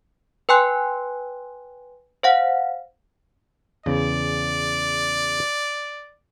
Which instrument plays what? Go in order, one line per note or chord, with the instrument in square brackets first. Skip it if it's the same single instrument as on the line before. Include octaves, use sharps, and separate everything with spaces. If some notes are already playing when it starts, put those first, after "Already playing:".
[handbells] B4 G5 G#5 C6 F#6
C5 F5 F#5
[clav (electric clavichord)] E2 C#3 [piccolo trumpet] D5